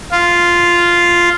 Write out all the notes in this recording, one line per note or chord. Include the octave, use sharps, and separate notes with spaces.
F4